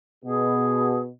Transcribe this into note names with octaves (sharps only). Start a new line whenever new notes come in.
B2 G#4